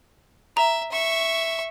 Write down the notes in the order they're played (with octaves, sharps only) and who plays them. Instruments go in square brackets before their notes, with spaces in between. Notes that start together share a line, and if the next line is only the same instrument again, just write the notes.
[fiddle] E5 [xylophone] A#5
[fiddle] E5 C#6